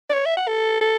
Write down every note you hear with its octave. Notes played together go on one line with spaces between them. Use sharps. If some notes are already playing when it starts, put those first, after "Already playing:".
D5
C#5
E5
F#5
A4
A4